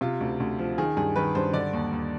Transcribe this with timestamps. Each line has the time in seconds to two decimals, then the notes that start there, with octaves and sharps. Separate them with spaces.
0.01 C3 F4
0.20 D2
0.40 D2
0.59 F3
0.78 D#3 G#4
0.97 G2 G#4
1.16 D#3 B4
1.35 G2 C5
1.53 D3 D5
1.73 D#2
1.93 D#2